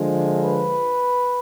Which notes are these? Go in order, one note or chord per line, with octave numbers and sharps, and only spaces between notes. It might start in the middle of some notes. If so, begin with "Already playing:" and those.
Already playing: D3 F3 G#3
B4